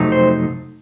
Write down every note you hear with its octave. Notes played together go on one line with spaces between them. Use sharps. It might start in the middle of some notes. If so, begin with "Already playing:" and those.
Already playing: F2 C3 F#3 A3 D#4
C5